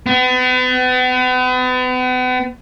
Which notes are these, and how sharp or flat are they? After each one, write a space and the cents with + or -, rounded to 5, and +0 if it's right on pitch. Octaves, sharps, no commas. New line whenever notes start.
B3 +40